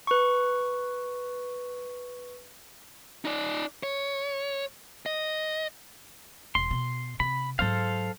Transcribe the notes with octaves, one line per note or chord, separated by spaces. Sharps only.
B4 C#6
D#4 D5
C#5
D#5
E1 C6
B2
C3 B5
G#2 F#3 A4 C5 F5